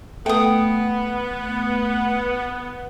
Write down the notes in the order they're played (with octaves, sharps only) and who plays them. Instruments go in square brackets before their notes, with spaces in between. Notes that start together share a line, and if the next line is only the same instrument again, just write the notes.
[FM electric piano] A3 [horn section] B3 [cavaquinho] G5 D#6